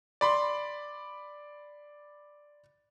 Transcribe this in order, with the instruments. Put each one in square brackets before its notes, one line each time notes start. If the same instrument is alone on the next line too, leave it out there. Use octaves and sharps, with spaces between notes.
[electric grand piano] D5 B5 C6